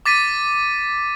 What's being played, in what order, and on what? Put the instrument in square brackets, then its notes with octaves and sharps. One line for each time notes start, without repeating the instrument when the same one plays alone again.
[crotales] D6 A6 B6 D#7